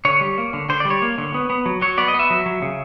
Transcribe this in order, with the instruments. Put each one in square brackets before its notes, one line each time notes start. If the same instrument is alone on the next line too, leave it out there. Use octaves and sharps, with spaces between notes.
[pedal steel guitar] D3 C#5
G3
A#3
D3
D3 C5
D5
G3
C#5
A#3
D3
B3
B3
F#3
F#3 C#5
B3 D5
D#5
B3
E5
F#3
F#3
C#3